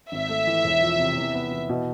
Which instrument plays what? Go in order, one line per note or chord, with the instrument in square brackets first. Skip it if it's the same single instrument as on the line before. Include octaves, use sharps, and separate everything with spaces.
[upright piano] G#1 [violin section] E5
[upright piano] A3
E3
E1
F3
C3
E2
B3
E3
B2